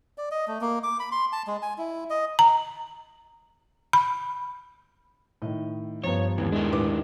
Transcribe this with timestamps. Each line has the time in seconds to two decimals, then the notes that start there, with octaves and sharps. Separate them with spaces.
0.18 D5
0.31 D#5
0.47 A3
0.61 A#3
0.83 D6
1.00 B5
1.12 C6
1.32 A5
1.47 G#3
1.62 G#5
1.78 E4
2.10 D#5
2.39 A#5
3.93 B5
5.42 A2 D#3 D#5
6.04 G2 F3 B3 C#5 A#5 A6
6.38 D#2 G#2 E3 B3 G#6
6.52 G#3 D4 E4 A#4
6.72 A1 B4 D6